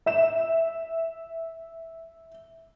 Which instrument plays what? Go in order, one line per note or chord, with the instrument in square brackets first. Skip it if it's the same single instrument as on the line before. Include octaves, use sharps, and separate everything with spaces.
[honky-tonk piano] E5 E7